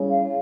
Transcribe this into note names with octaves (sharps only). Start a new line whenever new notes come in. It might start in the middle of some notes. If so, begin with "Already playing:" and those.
Already playing: C#3 G3 C#4 E4
F5